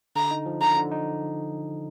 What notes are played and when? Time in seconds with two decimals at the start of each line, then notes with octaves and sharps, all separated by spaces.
0.16 D3 A#5
0.31 D#4
0.46 F3
0.61 D3 A#5
0.77 D3
0.91 D#4